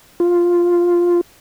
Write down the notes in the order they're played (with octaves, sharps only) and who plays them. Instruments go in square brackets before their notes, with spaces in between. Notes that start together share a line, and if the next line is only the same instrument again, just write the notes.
[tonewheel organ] F4